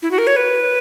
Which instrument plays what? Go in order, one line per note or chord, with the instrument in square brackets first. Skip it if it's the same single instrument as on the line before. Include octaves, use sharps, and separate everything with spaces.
[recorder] E4
F#4
A#4
C#5
B4